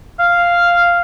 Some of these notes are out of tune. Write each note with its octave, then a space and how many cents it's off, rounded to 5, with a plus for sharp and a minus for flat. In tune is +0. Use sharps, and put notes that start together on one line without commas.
F5 -5